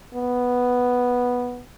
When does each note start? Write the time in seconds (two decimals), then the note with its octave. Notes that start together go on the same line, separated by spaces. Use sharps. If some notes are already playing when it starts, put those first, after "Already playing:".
0.14 B3